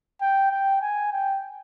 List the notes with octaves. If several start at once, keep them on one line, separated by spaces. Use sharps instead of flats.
G5
G5
G#5
G5